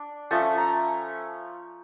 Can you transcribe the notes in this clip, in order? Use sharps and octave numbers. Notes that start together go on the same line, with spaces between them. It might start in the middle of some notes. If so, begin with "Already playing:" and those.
Already playing: D4
F3 A3 C#4 A5
A#5